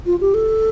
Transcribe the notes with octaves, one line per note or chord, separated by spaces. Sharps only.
F4
G4
A4